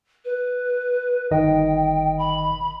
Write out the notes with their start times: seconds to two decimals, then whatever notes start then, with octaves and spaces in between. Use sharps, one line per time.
0.25 B4
1.31 G1 D#3 D#5 G5
2.18 B5